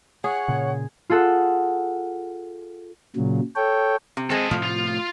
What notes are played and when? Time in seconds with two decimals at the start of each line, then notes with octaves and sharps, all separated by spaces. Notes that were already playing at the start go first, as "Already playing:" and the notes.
0.24 G#4 C#5 F#5
0.48 A#2 C#3
1.10 F4 G#4 A4 F#5
3.16 A#2 C#3 F#3
3.56 A4 C#5 G5
4.17 C3
4.30 G#3 C4 A4 D#5
4.51 A2 C3 F3 A3
4.63 F4